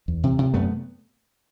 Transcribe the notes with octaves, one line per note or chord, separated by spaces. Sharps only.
E2
C3
C3
F#2 A3 B3